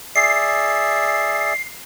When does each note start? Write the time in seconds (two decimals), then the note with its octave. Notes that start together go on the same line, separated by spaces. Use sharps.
0.16 G#4 D5 E5 C7